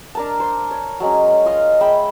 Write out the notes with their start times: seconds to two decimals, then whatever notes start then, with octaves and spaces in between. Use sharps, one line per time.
0.15 D4 A#4 A5
0.40 C5
0.71 C#5
1.00 F#3 G#3 C#4
1.45 F4 D#5 F5
1.81 G#3 E5 G5 B5